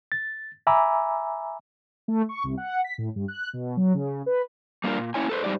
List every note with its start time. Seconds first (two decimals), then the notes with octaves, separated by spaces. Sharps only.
0.12 A6
0.67 E5 G#5 A#5 B5 D6 E6
2.08 A3
2.29 C#6
2.44 C2
2.57 F#5
2.84 B6
2.98 A2
3.16 G2
3.28 F#6
3.53 B2
3.77 F#3
3.94 C#3
4.26 B4
4.84 G3 A#3 D4 F4 A#4
4.98 A#2
5.14 A#3 C#4 E4 C#5 G#5
5.30 A4 B4 C5
5.44 G#2 G3 D#4 G4 C5 D5